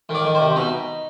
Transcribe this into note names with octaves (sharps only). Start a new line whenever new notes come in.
D#3
D5
D#3
C5
C3
B2 D#4